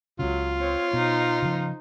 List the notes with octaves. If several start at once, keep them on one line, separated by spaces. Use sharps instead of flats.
C#2 C#3 F#3 F4
C4 C#5
B2 D#4 C5
C#3 F3